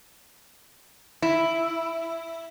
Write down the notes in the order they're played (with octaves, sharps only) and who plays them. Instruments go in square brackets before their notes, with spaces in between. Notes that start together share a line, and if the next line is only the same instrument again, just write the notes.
[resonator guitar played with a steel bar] E4